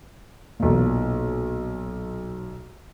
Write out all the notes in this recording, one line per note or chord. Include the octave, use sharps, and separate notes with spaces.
B1 A#2